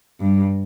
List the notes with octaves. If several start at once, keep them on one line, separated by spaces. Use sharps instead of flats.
G2